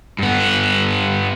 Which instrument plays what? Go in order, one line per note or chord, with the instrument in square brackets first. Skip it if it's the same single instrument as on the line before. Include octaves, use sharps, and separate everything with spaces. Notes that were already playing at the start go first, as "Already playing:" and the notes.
[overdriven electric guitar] G2 B3